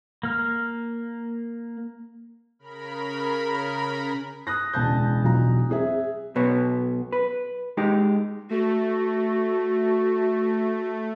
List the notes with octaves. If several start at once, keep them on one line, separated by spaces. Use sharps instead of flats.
A#3 F6
C#3 A#4 B5
D#6 F#6 A#6
E1 C#2 A5 G6
E1 B1 F#3 F4 A#5
C4 G#4 E5
B1 B2 B3 C#5
B4
G#3 D#4 G4
A3 F#4